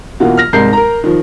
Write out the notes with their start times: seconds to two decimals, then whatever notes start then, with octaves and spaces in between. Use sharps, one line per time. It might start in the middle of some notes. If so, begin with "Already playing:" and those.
0.20 B2 E3 A#3 F4 F#4
0.37 F6 A#6
0.53 C2 G#2 G#3 A#4 G6 C7
0.73 A#4 A#5
1.04 D#3 F3